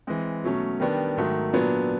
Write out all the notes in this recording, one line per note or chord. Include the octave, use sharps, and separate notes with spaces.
E3 G#3 C4
B2 F#3 A3 C#4
D#3 G3 B3 D4
G#2 D#3 F#3 A3
A#2 F#3 B3 D4